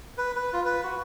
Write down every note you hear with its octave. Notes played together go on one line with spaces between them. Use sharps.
B4
B4
F4
B4
F#4